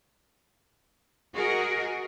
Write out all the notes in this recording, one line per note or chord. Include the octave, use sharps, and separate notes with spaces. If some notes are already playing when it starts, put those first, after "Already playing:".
F#4 G#4 A#4 D#5